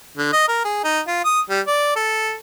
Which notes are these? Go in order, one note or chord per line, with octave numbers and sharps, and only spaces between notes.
D3
D#5
A#4
G#4
D#4
F4
D#6
G3
D5
A4